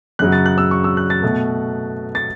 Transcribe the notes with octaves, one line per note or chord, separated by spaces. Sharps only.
F#2 C#3 F#3 F#6
A6
F#6
E6
C#6
E6
F#6
A6
B2 A3
A6